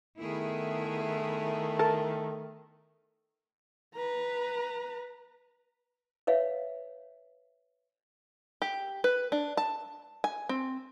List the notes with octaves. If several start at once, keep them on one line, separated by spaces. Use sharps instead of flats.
D#3 A3 B3 E4 G#4
A4 A#4 A5
B4 A#5
B4 C#5 E5 F5
G4
B4
D4
A5
G#5
C4